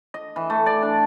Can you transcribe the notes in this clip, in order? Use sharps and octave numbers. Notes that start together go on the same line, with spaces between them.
D#5
E3
A3
D5
D4